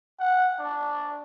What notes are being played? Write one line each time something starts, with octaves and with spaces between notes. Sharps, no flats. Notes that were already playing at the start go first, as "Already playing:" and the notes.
F#5
D4